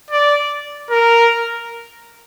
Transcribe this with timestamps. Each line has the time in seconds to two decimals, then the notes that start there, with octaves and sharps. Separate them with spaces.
0.11 D5
0.91 A#4